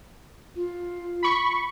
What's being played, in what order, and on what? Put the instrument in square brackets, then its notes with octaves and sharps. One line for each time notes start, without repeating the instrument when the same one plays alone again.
[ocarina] F4
[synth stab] B5 C#6